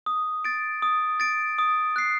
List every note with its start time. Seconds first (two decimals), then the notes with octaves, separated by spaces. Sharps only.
0.06 D#6
0.45 A6 D7
0.82 D#6
1.20 A6 D7
1.58 D#6
1.96 F#6 C7